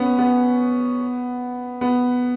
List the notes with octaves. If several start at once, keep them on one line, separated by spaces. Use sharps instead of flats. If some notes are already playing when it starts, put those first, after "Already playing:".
Already playing: B3 C#4
B3
B3